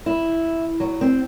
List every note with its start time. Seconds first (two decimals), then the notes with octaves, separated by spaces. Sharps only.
0.06 E4
0.80 F#3
1.01 C4